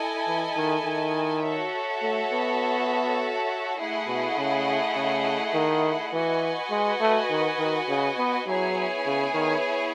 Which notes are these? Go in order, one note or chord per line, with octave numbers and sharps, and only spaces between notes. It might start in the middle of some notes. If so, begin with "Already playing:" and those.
Already playing: E4 A4 D#5 G#5
E3
D#3
D#3
F#4 A4 C#5 E5
A3
B3
A3 E4 G#4 D#5 F#5
B2
C#3
C#3
D#3
E3 F#4 B4 D#5 G#5
G#3
A3
D#3
D#3
C#3
B3
F#3 B3 E4 G#4 C#5 G#5
C#3
D#3